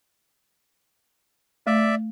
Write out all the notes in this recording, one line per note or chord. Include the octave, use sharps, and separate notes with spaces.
A3 D5 E5